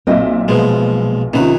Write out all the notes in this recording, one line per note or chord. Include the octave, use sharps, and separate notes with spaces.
B1 A#2 C4 D#5 E5
B2 F3 G#3
C3 D#3 C#4 F4 B4